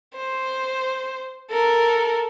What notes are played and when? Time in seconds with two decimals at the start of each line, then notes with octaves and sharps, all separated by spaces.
0.16 C5
1.51 A4 A#4